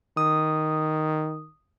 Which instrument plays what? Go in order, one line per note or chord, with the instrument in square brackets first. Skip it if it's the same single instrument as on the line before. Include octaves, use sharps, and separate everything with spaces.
[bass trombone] D#3 [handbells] D#6